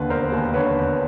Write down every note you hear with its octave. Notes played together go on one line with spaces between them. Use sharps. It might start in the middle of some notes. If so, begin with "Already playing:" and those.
Already playing: D#2 D3 B4
E1 A#4 C5
D#2
D3 B4 C#5
E1